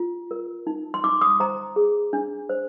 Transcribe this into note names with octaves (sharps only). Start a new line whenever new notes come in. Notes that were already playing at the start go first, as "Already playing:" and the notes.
Already playing: F4
A#4
D#4
C6
D#4 D6
D#6
C5 A#5
G#4
D4
C5